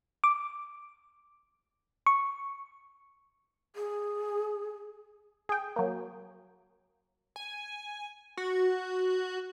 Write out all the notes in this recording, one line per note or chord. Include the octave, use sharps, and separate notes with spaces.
D6
C#6
G#4
G#4 G5
F#3 A#3
G#5
F#4